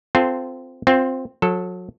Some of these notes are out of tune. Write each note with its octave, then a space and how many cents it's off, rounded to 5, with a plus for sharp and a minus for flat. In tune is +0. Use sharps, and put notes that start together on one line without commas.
C4 -15 F4 +0 A4 +0
C4 +0 F4 +25
F#3 -30 A4 +5